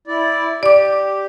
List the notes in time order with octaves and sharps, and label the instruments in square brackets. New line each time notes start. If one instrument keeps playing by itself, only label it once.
[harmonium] E4 D5
[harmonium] G4 [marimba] D5 D6